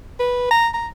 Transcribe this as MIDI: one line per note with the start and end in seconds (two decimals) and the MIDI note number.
0.20 0.48 71
0.51 0.68 82
0.74 0.88 82